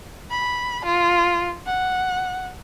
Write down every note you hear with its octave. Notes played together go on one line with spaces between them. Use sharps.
B5
F4
F#5